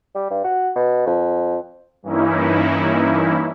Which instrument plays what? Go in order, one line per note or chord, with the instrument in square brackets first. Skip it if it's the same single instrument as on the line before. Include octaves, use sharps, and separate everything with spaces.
[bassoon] G3
G2
F#4
B2
F2
[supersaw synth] G2 E3 A#3 C#4 D#4 E4